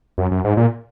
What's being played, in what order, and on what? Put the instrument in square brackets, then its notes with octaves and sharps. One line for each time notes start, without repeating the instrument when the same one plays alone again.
[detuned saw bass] F#2
F#2
G#2
A#2